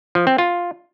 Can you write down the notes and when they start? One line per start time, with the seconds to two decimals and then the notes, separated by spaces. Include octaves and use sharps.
0.15 F3
0.27 C4
0.38 F4